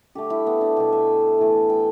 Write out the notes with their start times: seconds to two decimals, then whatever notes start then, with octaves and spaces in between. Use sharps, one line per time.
0.15 D3 A3 G4
0.30 E4
0.46 B3
0.61 D4
0.76 B2 A3 G4
0.92 E5
1.39 A2 E3 A3
1.70 G5